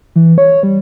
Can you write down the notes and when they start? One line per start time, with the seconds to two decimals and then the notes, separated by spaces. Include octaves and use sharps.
0.16 E3
0.38 C#5
0.63 G3